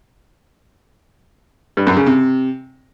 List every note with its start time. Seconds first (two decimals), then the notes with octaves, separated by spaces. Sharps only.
1.77 G2
1.87 F#2
1.97 C#3
2.06 C3